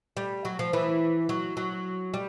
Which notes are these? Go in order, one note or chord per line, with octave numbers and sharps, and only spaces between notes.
G3
F#3
F3
E3
F#3
F#3
G3